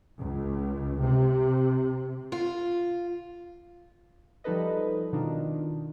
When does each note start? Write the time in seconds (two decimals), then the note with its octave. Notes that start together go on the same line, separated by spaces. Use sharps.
0.20 C#2
1.01 C3
2.32 F4
4.44 F3 G3 D#4 A4 B4 D#5
5.13 B2 D#3 D4 D#4 F4